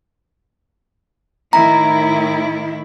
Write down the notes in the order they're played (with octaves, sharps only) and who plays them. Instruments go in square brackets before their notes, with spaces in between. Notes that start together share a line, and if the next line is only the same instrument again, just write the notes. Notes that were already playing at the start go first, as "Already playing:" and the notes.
[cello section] A2 D#3 E4 [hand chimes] A#5